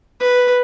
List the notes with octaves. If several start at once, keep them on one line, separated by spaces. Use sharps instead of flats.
B4